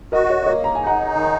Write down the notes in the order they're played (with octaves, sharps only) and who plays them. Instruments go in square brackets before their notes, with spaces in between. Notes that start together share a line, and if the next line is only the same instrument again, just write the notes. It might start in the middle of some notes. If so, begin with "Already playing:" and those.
[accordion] F#4 [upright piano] A#4 D#5
[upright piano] D#5
C#5
D#5
[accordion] A#3 [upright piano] C#5
[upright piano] A#5
G#5
[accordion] D#4
[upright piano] F#5 A#5
[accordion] D#3